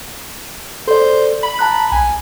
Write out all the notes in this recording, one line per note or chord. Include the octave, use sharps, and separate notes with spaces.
A4 C5 D5
B5
A5 A#5 F#6
B1 G#5